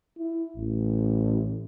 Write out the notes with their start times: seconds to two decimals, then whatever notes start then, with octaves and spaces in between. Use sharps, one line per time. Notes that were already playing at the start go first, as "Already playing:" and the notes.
0.18 E4
0.56 A1